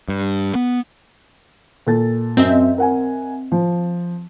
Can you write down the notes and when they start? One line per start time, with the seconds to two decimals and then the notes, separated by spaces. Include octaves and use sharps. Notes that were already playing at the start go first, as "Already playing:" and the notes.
0.08 G2
0.55 B3
1.87 A#2 A4 A6
2.37 F#2 C4 D#5 E5
2.78 A#4 F#5 G#5
3.52 F3